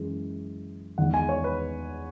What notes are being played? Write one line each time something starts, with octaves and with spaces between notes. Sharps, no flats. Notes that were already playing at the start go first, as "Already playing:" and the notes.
Already playing: F#2 E3 G#3
E2 D#3 G#3 F#5
G#5
C#5
B4